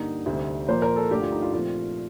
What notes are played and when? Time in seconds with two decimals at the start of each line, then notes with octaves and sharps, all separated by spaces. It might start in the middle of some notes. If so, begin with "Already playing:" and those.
Already playing: G2 D3 G3 A#3 D#4
0.26 D2 C3 G3 C4
0.68 A#2 F3 A#3 C5
0.82 A#4
0.96 A4
1.11 G2 D3 A3 G4
1.21 F4
1.32 D#4
1.42 F4
1.53 A#2 F3 A3 C4 F4